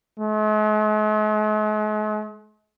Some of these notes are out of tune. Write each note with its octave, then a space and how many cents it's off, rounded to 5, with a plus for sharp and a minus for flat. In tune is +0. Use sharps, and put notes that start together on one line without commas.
G#3 +45